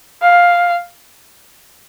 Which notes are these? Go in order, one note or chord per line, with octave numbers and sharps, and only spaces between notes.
F5